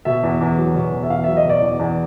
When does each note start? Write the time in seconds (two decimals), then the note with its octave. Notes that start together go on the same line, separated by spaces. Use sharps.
0.05 B2 E5
0.23 E2
0.41 E2
0.58 F#3
0.75 B2
0.92 E2
1.03 E5
1.10 E2 F5
1.24 F#3 E5
1.37 D#5
1.45 B2 D5
1.62 E2
1.79 E2